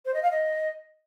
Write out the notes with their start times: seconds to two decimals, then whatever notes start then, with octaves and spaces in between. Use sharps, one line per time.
0.05 C5
0.14 D#5
0.23 F5
0.31 D#5